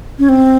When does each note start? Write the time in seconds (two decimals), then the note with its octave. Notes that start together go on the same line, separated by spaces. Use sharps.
0.19 C#4
0.29 C4